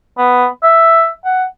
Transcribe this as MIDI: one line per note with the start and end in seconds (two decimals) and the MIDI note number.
0.18 0.46 59
0.63 1.10 76
1.25 1.45 78